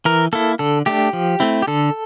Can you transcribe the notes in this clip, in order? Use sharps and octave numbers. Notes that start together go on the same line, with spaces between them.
E3 A#4
A#3 E4 A4
D3 A4
A3 D4 G4
F3
A3 C4 E4
G4
D3 A4